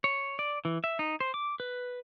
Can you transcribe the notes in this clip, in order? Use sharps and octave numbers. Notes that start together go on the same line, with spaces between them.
C#5
D5
E3
E5
D#4
C5
D6
B4